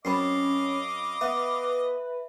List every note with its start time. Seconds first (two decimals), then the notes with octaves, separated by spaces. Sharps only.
0.05 F#2 C4 C#4 D#5 F5 B5 D6 C7
1.21 B3 B4 E5